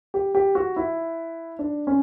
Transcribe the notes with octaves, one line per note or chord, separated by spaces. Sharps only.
G4
G4
F#4
E4
D4
C#4